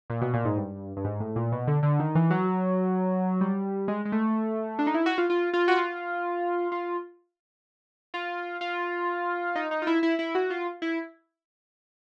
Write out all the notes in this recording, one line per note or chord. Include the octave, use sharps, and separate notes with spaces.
A#2
B2
A#2
G#2
G2
G2
G#2
A2
A#2
B2
D3
D3
D#3
E3
F#3
G3
G#3
G#3
A3
D4
D#4
E4
F#4
F4
F4
F4
F#4
F4
F4
F4
F4
D#4
D#4
F4
E4
E4
E4
F#4
F4
E4